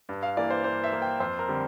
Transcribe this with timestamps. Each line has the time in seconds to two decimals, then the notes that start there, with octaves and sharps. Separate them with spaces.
0.09 G2
0.23 F5
0.37 E3 A#3 D5
0.50 C5
0.64 G2 C5
0.84 E5
0.92 E3 A#3
1.02 G5
1.20 F2 C5
1.39 A#4
1.48 D3 G3 C4